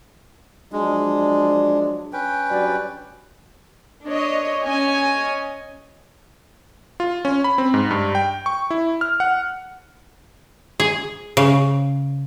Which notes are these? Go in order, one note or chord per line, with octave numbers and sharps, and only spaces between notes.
F3 F#3 G#3 D4
C#4 B4 G5
G2 F#3 D5
D4 C#5 D#5
C#4 C#5 D#5 G#5
F4
C#4
B5
C4
G#2
G2
G5
C#6
E4
F6
F#5
G#4
C#3